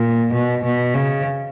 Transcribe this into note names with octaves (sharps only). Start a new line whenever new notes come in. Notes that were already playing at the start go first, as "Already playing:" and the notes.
Already playing: A#2
B2
B2
C#3